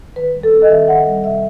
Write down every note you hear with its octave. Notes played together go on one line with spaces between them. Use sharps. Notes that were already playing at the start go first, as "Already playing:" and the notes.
D#3 B4
G3
A4
C4
D#5
D#3 E5
D#3 F#5
G3
C3 E5